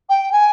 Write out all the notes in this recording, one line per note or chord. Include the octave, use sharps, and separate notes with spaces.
G5
G#5